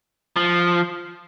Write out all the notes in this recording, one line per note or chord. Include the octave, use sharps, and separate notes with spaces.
F3